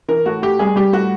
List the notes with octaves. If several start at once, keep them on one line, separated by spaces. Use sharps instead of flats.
E3 A#4
A2 F#4
A2 G4
G3 G#4
G3 G4
A2 F#4